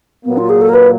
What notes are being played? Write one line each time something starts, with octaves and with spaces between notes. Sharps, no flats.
A#2 F#3 A#3 B3
F4
G#4
A4
A#4
B4